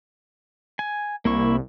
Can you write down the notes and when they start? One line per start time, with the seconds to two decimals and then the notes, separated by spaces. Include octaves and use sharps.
0.79 G#5
1.25 C2 A#3 E4 C#6